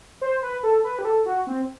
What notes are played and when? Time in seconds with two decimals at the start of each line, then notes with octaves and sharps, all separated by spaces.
0.21 C5
0.42 B4
0.63 A4
0.84 B4
0.99 G4
1.05 A4
1.26 F#4
1.47 C4